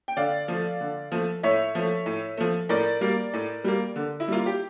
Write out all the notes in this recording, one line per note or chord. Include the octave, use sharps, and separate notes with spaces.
G5
D3 D5 F5
F3 A3
D3
F3 A3
A2 C#5 E5
F3 A3
A2
F3 A3
A2 A#4 D5
G3 A#3
A2
G3 A#3
D3
E4
G3 A#3 F4
G4